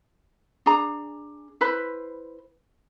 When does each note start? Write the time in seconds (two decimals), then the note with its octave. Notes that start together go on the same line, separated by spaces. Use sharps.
0.66 D4 G#4 A#5
1.61 E4 B4 C5 B5